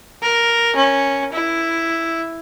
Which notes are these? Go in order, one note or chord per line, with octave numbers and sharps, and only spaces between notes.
A#4
C#4
E4